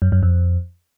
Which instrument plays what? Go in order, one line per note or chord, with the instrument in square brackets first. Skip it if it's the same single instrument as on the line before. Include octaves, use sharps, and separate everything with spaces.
[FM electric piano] F#2
F#2
F2